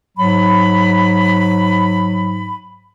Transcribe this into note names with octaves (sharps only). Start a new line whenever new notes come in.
G#2 F#3 B5